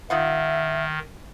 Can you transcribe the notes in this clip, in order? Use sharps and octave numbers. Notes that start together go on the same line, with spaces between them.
D#3 D#4 F4 E5 F#5